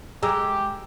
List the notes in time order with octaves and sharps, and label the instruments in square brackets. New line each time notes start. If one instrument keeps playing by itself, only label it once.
[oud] G#3 [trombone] G4 [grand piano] A#5 E6